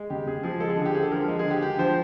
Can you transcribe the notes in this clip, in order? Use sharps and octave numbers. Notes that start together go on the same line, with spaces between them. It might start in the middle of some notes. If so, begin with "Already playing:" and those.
Already playing: G#3
C#3 G4
C#3 G#4
F3 G#4
G#3 A4
G#4
D3
G4
D3 G#4
A4
F3 A#4
G#3
G#4
D3
G4
D3 G4
F3 C5